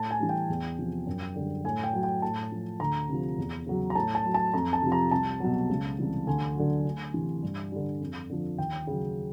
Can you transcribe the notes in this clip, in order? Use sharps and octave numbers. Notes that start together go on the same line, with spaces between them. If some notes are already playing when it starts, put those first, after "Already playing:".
Already playing: A2 A5
G#5
E3 G3
G5
E2
C3 F3
F#2
D3 G3
A2 G#5
G5
F#3
G5
A2 A5
F3
D2 A#5
C3 F3
E2
C#3 F#3
A#5
A2 A5
A5
F#3
A5
F2 A#5
A5
C3 F3
A#5
C2 A5
B2 F#3
C#2
C3 E3 G3
D2 G#5
D3 F#3
D2
C3 E3
G2
D3 G3
F2
D3 F3
D#2 G5
C#3 F#3